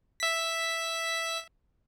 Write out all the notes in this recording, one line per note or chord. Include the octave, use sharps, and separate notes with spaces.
E5 B6